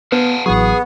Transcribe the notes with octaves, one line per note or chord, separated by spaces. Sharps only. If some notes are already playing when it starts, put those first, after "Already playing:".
B3 B4 F5 F#5 A5
A1 E3 F#3 B3 G#4 C#6